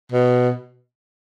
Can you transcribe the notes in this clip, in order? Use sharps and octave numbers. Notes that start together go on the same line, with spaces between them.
B2